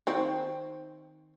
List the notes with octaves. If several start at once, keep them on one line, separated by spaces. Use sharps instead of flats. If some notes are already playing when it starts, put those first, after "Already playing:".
D#3 C4